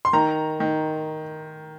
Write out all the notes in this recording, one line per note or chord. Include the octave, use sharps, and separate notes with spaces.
C6
D#3 A#5
D#3